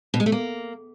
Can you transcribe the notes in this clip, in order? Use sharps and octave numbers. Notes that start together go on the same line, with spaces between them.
B2
G#3
A3
A#3